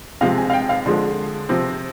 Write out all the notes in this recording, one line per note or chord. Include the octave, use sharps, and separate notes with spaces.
C3 F3 G#3 C4 F5
G#5
F5
G5
F5
D3 F3 G#3 C6
C3 F3 C4